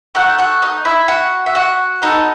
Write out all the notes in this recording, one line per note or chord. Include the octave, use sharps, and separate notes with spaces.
A3 D#4 F#4 A4 F#5
F#4 F#5
D#4 D#5
E4 E5
F#4 F#5
E5
F#4 F#5
B3 D#4 F#4 A4 D#5